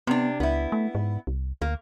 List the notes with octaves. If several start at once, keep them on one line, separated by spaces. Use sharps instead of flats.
C3 B3 D4
C#2 B3 E4
A3
G#2
C2
D2 A#3